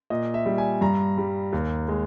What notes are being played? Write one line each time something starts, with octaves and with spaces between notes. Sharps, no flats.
A#2 D#5
E5
G3
G#5
G2 A#5
G3
D#2
G#3